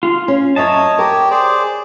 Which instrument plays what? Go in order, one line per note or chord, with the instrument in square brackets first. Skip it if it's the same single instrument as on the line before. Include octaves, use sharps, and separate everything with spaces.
[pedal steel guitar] F4
[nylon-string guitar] C#4
[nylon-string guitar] F#2 E5 [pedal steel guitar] C#5 A5 [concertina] D#5
[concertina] G4 [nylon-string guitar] A#4
[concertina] G#4 C5 D5